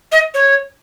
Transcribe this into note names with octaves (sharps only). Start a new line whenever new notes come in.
D#5
C#5